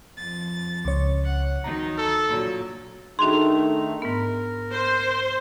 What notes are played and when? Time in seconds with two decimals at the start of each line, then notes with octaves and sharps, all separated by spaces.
0.16 F2 A6
0.85 C#2 C#5
1.24 F#5
1.64 D#3 F#3 D#4 A#5
1.98 A4
2.27 A#2 D3 F#3
3.19 D#3 A3 D4 D#4 F#4 G#4 C6 F7
4.02 G#2 B3 A#4
4.72 C5